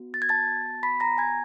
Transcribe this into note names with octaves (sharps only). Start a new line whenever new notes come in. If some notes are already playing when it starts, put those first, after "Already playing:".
Already playing: B3 F#4
A6
G#6
A5 A6
B5 B6
A#5 A#6
G#5 G#6